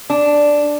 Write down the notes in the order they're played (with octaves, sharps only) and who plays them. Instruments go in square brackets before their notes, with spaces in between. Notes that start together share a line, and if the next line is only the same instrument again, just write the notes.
[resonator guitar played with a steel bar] D4